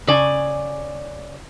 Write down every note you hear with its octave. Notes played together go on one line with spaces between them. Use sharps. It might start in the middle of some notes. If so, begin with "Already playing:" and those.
C#3 D5 G#5